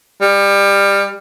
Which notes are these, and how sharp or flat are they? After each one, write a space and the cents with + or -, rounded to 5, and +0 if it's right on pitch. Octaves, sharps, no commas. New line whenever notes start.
G3 +25